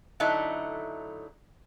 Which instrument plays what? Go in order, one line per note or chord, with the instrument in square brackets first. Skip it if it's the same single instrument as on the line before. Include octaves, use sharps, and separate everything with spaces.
[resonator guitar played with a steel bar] D3 F#3 A3 D#4 E4